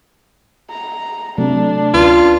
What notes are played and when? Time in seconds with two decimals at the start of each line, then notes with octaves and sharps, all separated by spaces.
0.70 A#5
1.38 C3 F#3 A3 D4
1.94 D2 C#4 F4 B4